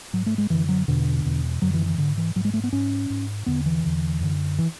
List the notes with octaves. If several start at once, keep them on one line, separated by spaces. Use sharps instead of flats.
G#2 F#3
A3
G#3
F#2 D3 E3
F#3
E2 B2 D3
E2 B2
F#2 D3 F#3
E3
E3
G#2 D3
E3
G#2 F#3
G#3
A3
B3
G#2 C#4
G#2
E2 D3 B3
E3
E2 D3
F#2 D3
E3